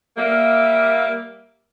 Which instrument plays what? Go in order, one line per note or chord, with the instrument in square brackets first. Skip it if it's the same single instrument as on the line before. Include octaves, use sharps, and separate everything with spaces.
[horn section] G3 A#3 [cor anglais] E5